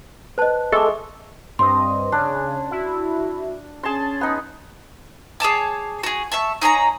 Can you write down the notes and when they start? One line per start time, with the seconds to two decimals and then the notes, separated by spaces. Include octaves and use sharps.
0.38 B4 C5 D#5 A5 F#6
0.72 G#3 A4 E5 C#6 D6
1.59 G2 C4 D#5 C6
2.12 C#3 D4 C#5
2.71 E4 F#4
3.83 C#4 G#4 A5 C6
4.21 B3 D#4
5.40 G#4 C#5 A5 D6
6.03 F#4 G#4
6.32 E5 A5 C#6
6.62 D#4 G#4 C#5 A#5